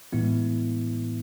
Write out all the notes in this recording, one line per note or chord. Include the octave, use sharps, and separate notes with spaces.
A2 E3 G#3 B3 E4